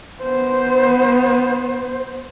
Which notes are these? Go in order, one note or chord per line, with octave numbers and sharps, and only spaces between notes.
B3 C5